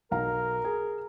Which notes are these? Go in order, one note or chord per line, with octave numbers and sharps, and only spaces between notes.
B1 A#4 F5 A#5
G#4